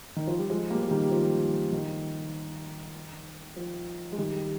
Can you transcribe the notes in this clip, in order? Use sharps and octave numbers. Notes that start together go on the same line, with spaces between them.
D#3
F3
G3
F3 G#3
G3 A#3
F3
D#3 G3
F3
D#3
F3
G#3
D#3 G3